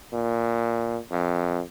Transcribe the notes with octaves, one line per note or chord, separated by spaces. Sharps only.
A#2
F2